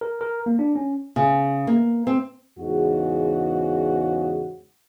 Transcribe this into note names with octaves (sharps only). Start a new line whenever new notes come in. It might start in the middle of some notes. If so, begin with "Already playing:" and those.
A#4
A#4
A#3
D4
C#4
C#3
A#3
C4
E2 G#2 C#3 F#4